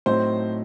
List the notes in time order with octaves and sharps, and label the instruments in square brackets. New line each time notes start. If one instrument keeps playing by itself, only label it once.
[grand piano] A2 F#3 A3 C4 D#4 [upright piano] C5